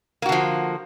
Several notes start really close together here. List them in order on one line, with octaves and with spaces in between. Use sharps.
A#3 F#4 D3 F3